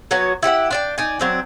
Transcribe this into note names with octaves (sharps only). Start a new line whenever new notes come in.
F#3 B3 F#4 C#5
E4 G4 C#5 F#5
D4 D5 G5
D#4 D5 G#5
F#3 C4 D4